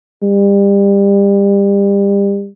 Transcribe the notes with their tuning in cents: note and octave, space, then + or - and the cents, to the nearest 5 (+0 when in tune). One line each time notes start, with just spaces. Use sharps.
G3 +30